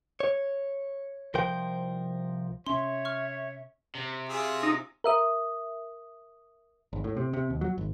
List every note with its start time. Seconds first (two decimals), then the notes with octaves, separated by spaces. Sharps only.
0.20 C#5
1.34 C2 F3 A#4 C5 G5
2.66 C3 C#4 C#5 E5 C6
3.05 C#6 F6
3.95 C3
4.29 F4 G#4 E5
4.63 D#4
5.04 A#4 E5 D#6
6.93 G#1
7.04 A2
7.17 C3
7.33 C3
7.50 D#2
7.61 F#3
7.78 G#1